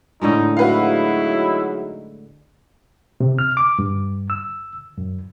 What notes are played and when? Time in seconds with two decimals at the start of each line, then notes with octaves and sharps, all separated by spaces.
0.21 A2 D3 G#3 D#4
0.57 F#3 D#4 E4 F#4 G#4 B4 F5
3.20 C3
3.39 F6
3.57 D6
3.79 G2
4.30 E6
4.98 F#2